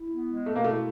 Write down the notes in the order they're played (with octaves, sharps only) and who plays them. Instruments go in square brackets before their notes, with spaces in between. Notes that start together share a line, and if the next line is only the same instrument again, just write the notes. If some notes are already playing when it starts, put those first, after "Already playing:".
Already playing: [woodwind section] E4
B3
G#3
[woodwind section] B2 [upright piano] A3
[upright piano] A#3
[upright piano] A3 [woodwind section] E4